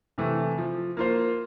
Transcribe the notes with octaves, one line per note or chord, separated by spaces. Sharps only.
C3 E3 A3
F3
A#3 F4 C5